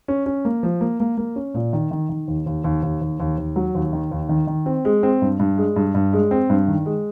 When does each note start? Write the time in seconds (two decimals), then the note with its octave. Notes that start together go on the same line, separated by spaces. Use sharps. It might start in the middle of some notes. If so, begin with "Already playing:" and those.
0.08 C#4
0.26 C#4
0.45 A#3
0.63 F3
0.81 A#3
1.00 A#3
1.17 A#3
1.36 C#4
1.54 A#2
1.73 D#3
1.91 D#3
2.09 D#3
2.28 D#2
2.46 D#2
2.64 D#2
2.83 D#2
3.01 D#2
3.20 D#2
3.38 D#2
3.56 F#3
3.75 D#2
3.93 D#3
4.11 D#2
4.29 D#3
4.47 D#3
4.66 C4
4.85 G#3
5.03 C4
5.22 G2
5.39 G2
5.58 G#3
5.76 G2
5.95 G2
6.13 G#3
6.31 C4
6.50 G2
6.68 D#3
6.86 G#3